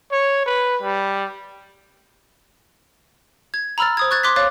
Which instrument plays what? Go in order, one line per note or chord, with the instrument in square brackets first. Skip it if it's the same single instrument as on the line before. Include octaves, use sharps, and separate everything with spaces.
[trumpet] C#5
B4
G3
[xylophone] G#6
A#5 B5 E6 F6 A6
C5 D#6 G#6
C#6 F#6 G#6 A6
C6 D6 F#6 B6
C#5 F5 D6 F#6 A6